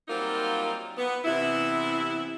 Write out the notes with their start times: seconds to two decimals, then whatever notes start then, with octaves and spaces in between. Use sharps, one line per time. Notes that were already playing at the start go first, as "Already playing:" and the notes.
0.08 F#3 G3 A#3 C4 D#4 F4
0.98 B3
1.25 C3 E3 B3 E4